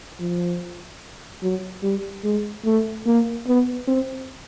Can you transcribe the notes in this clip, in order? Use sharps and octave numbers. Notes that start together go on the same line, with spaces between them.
F3
F#3
G3
G#3
A3
A#3
B3
C4